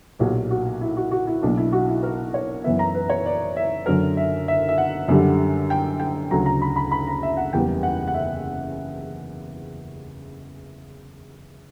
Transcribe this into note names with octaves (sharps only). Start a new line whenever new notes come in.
B1 A#2 F#3 A#3 G4
F#4
E4
F#4
F#4
E4
B1 B2 A#3 D4
E4
F#4
E4
A#4
C#5
F#2 E3 B3 E5
A#5
B4
C#5
D5
E5
F#2 D3 F#3 A#4
E5
E5
E5
F#5
F#2 D3 G3
G5
G5
D2 C#3 F#3 A#5
A#5
B5
B5
B5
A#5
E5
F#5
F#1 E2 C#3 G3 B3 G5
F#5
F#5
E5